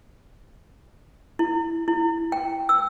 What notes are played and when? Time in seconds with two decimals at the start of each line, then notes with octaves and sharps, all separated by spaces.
1.39 E4
1.88 E4
2.32 G5
2.69 E6